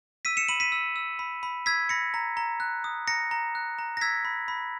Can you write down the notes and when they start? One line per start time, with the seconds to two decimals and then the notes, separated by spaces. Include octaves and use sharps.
0.25 E6 B6 D#7
0.37 C#7 E7
0.48 B5 D#7 F#7
0.60 B6 D#7
0.72 E6
0.96 E6
1.19 B5
1.43 B5
1.66 E6 G#6 B6
1.89 B5 A#6 C#7
2.14 A#5
2.37 A#5
2.60 F#6
2.84 D#6
3.07 A#5 A#6 C#7
3.31 A#5
3.55 F#6
3.79 A#5
3.97 A#6
4.01 E6 G#6 B6
4.25 B5
4.48 B5